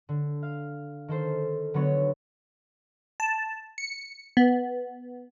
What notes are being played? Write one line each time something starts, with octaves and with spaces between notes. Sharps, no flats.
D3
F5
D#3 A4 C5
D3 F#3 B3 C#5
A5
C#7
B3